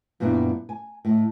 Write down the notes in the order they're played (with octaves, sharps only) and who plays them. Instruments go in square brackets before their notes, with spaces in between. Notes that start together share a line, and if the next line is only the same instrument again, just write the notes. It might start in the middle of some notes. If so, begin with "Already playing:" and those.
[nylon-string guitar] F#2 A#2 G3 B3 D4 E4
G#5
A2 D#5